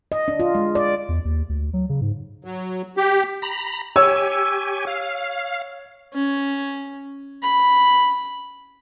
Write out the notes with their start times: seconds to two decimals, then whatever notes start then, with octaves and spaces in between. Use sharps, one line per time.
0.12 D#5
0.28 D4
0.40 F4
0.55 G#3
0.75 D5
1.09 E2
1.25 D#2
1.49 D2
1.73 F#3
1.89 C#3
2.01 G#2
2.44 F#3
2.97 G4
3.42 A#5 B5
3.96 G4 C#5 G#5 E6
4.87 F5
6.13 C#4
7.43 B5